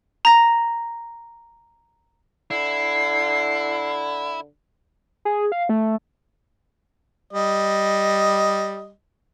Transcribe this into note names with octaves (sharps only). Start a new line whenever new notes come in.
A#5 A#6
D3 E4 C7
G#4
F5
A3
G3 D#5